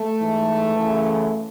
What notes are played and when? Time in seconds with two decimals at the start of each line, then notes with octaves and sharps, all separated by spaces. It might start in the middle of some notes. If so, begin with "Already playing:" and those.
Already playing: A3
0.19 G#2 E3
0.75 F#2 C#3 E3